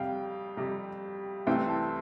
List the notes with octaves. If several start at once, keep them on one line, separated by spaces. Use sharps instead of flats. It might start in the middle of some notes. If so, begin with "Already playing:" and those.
Already playing: F2 C3 G3 F5 G5
F2 C3 G3
C2 C3 E3 A3 C4 G5
A5